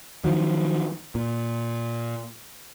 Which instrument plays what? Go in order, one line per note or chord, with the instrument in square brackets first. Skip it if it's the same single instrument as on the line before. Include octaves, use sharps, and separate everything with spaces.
[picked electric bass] D#3 F3 F#3
A#2